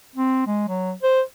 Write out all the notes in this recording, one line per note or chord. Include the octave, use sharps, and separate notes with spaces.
C4
G#3
F#3
C5